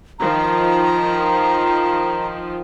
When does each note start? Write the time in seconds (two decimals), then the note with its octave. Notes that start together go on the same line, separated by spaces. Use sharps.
0.19 D#3 F3 A#5